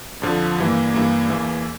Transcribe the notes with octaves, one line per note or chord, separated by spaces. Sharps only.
F2 D3 F3
G2 E3 A#3
G2 E3 A#3
E2 E3 A#3